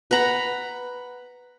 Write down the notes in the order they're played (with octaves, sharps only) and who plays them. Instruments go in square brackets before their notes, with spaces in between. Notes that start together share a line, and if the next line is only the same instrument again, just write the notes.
[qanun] B4 F#5 A#5 B5